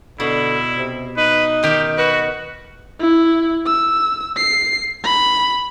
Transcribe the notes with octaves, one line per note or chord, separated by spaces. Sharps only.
B2 D3 E4
C3
D#4 B4
D#3 G4
F#4 B4
E4
E6
C7
B5